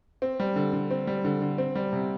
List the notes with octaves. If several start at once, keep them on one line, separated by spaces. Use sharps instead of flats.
C4
G3
D3
D3
C4
G3
D3
D3
C4
G3
C3